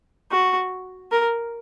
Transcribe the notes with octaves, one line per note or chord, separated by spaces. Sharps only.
F#4
A#4